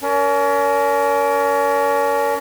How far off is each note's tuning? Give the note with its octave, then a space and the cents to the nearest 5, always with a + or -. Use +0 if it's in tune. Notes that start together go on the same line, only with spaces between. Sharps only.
C#4 +35 A#4 +0